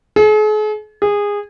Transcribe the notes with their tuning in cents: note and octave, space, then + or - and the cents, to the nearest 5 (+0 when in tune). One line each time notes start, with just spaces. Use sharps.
G#4 +45
G#4 -20